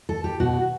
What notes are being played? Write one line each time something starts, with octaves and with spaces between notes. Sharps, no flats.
A4
G4
B2 F#4